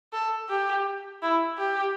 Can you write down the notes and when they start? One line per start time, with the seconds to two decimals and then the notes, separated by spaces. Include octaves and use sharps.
0.13 A4
0.49 G4
1.22 E4
1.58 G4